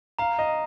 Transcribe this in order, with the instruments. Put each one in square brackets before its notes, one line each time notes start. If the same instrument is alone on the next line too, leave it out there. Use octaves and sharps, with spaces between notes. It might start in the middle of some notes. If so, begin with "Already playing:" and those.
[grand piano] F5 [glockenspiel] A#5
[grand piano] D#5